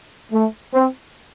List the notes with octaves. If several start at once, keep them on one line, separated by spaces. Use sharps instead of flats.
A3
C4